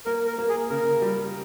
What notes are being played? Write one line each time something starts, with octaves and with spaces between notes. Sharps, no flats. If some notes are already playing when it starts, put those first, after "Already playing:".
A#3 A#4
A#4
A#3
G#4
C#3 A#4
G3